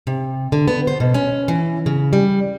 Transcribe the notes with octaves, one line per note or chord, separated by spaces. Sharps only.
C3
D3
B3
C5
B2
C#4
E3
C#3
G3